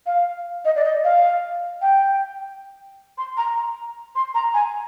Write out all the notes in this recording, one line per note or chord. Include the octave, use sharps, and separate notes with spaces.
F5
D#5
D5
D#5
F5
G5
C6
A#5
C6
A#5
G#5